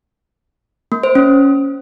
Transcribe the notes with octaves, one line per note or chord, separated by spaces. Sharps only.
A#3
C5
C#4